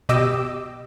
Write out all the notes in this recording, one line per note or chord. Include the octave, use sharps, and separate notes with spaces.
B2 G4 D#5 D6 E6